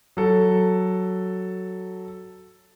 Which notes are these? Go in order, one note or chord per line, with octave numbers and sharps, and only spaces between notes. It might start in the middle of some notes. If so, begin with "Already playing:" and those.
F#3 A4